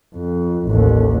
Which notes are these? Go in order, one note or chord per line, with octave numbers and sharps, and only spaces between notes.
F2
A1 D#2